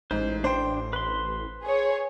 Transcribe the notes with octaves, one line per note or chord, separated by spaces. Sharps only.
A1 G#2 C5
D4 C5 G5
B4 C6
G#4 C#5